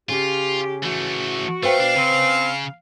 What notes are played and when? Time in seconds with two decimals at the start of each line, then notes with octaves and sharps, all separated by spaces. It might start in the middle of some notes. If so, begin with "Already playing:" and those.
0.09 C#3 F4 G4
0.83 E3 A3 F#4
1.63 A3 B4 C5 F5 G5
1.80 B2 D4
1.96 C#3 C4